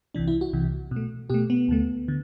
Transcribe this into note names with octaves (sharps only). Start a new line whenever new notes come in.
C2 C3 E3 D4
E4
F#4
C2 C3 E3
B2
A3
B2 A3 G4
B3
D2 D3 A3
D3